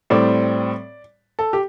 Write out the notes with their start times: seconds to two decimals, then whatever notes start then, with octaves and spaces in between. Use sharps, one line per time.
0.10 A2 G3 C4 D5
1.39 A4
1.53 G4